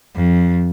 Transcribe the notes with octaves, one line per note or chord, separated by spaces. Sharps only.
F2